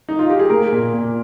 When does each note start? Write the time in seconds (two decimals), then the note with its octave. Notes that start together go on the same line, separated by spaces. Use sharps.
0.09 D#4
0.19 F4
0.30 G4
0.39 G#4
0.50 A#3 A#4
0.72 A#2
0.93 A#2